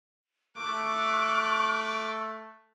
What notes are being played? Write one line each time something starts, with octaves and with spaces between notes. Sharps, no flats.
A3 C#6 D6 F#6